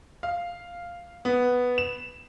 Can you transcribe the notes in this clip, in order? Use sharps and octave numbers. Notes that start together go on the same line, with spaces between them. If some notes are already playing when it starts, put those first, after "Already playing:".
F5
B3
E7